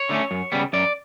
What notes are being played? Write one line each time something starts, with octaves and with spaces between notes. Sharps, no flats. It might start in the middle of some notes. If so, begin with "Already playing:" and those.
Already playing: C#5
D3 A3 C#4
F#2
C#3 G3 B3
F#2 D5